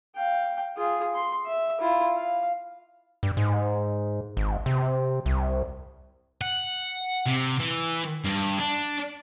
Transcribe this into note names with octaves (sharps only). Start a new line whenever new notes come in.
F5 G5
F4 G#4
C6
E5
E4 F4
F5
G2
G#2
G#1
C3
C2
F#5
C3
E3
G2
D4